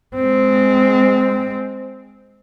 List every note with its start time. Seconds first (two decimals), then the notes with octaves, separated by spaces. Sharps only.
0.16 G#3 C4